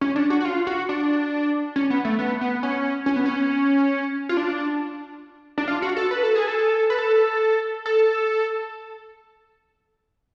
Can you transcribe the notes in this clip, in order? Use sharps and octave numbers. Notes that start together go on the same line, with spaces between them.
C#4
D4
F#4
F#4
F4
F#4
D4
C#4
B3
A3
B3
B3
C#4
C#4
B3
C#4
F4
D4
D4
F4
F#4
A4
B4
A4
G#4
A4
B4
A4
A4